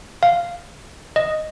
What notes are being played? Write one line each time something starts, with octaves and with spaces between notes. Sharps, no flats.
F5
D#5